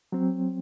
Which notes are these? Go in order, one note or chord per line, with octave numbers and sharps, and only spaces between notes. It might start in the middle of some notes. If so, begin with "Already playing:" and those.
F#3 C4